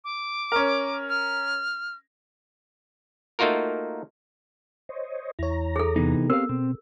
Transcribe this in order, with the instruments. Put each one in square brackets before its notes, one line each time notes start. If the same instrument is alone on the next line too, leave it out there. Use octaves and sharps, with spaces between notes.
[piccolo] D6
[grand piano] C#4 A#4
[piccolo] F6
[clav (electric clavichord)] A3 A#3 D#4 F4 F#4 A#4
[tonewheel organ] C5 C#5 D#5
[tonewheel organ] E2 A#5 [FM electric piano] E4 C#5
[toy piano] G#4 A4
[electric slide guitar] C3 E3 D#4 [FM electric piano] B3
[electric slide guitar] C4 G4 F5 [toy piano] A#4
[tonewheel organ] B2 [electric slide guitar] C4